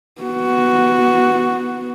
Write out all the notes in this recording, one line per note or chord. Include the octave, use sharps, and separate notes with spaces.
B3 F#4